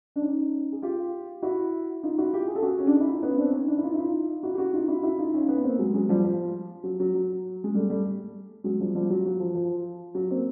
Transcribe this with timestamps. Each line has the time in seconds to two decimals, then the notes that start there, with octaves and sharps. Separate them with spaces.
0.16 D4
0.22 C#4 D#4
0.72 G#4
0.82 F4 G4
1.42 E4 F#4
2.03 D#4 F4
2.18 E4 F#4
2.33 F4 G4
2.48 G#4
2.55 A4
2.62 F#4 G#4
2.79 C#4
2.87 D4
2.94 D#4
3.01 E4
3.08 D#4 F4
3.23 B3 C#4
3.38 C4 D4
3.53 C#4 D#4
3.68 D4 E4
3.78 E4
3.83 D#4 F4
3.94 E4
3.98 D#4 F4
4.43 E4 F#4
4.54 G4
4.58 E4 F#4
4.73 D#4 F4
4.88 E4 F#4
5.03 E4 F#4
5.18 D#4 F4
5.34 C#4 D#4
5.48 B3 C#4
5.64 A#3 C4
5.79 F#3 G#3
5.94 F#3 G#3
6.09 F3 G3
6.24 F3
6.84 F#3
7.00 F#3
7.14 F#3
7.64 G#3
7.74 G3 A3
7.90 G3 A3
8.64 F#3 G#3
8.80 F3 G3
8.95 F3 G3
9.10 F#3
9.25 F#3
9.40 F3
9.55 F3
10.15 F#3
10.31 A#3 C4